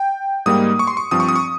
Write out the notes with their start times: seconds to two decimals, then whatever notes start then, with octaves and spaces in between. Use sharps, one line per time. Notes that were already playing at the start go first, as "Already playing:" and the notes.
Already playing: G5
0.46 G#2 G3 A#3 D#4 D#6
0.79 C#6
0.87 C6
0.97 C#6
1.11 G2 F3 C4 D#6
1.20 C#6
1.29 D#6
1.36 C#6